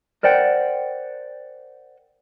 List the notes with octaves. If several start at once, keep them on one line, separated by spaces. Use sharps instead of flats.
A#4 C5 D5 F#5 G5